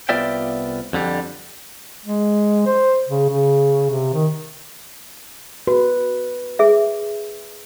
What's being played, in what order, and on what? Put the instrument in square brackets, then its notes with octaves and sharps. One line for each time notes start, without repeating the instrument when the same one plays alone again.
[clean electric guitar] C2 B3 F4 D5 E5 G5
F2 D3 G3
[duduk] G#3
C5
C#3
C#3
C3
D#3
[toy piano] F#4 [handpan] B4
[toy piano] G#4 E5